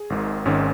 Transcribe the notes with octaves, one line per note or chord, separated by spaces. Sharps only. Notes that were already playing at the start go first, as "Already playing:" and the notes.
Already playing: G#4
G#1 G#2 D#3
G#1 G#2 D#3 C#4